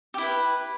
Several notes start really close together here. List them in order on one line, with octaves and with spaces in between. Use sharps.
G4 E4 B4